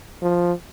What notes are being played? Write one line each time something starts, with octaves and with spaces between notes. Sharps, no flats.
F3